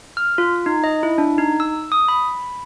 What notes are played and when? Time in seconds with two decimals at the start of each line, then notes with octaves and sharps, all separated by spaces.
0.17 F6
0.38 F4
0.66 D#4
0.84 D#5
1.03 E4
1.18 D4
1.38 D#4
1.60 E6
1.92 D#6
2.08 B5